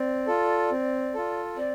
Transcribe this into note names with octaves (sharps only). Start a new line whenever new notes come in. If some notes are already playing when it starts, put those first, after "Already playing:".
Already playing: C4 D5
F4 A4
C4
F4 A4
C4 D5